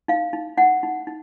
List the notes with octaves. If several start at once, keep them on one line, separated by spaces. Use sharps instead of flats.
D#4 F5
D#4
D#4 F#5
D#4
D#4